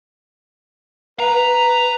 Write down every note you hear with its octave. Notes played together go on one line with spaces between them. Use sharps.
B4 A#5